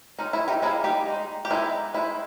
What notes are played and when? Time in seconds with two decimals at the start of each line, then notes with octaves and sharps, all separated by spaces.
0.18 G#3 C#4 D#4
0.33 E4
0.48 D#4 G4
0.62 G3 A#3 D#4 E4 G#4
0.84 D#4 G4
1.06 G#3 D#4
1.45 G4
1.50 G#3 B3 D#4 E4
1.94 D#3 G#3 D#4 E4